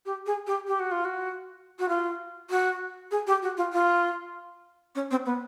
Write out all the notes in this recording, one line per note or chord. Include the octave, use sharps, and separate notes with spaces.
G4
G#4
G4
G4
F#4
F4
F#4
F#4
F4
F#4
G#4
G4
F#4
F4
F4
C#4
C4
B3